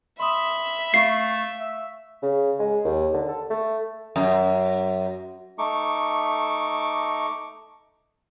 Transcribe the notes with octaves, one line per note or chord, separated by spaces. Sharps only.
E5 B5 C6 D#6
A3 F5 C#6 C7
E5
C#3
G#3
D#2
D3
A4
A3
F#2
A3 D#4 C#6 D6